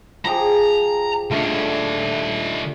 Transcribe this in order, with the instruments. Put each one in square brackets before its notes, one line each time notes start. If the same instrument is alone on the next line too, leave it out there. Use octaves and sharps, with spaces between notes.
[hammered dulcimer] F3 G4 G#4 [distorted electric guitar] A#5
[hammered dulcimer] D3 A3 [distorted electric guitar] D#3 F4